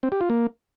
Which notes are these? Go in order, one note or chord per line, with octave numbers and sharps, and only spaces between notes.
C4
G4
F4
A#3